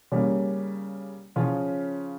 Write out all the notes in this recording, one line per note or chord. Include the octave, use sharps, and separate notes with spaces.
C#3 G3 A#3 C#4
C#3 F3 C#4 F4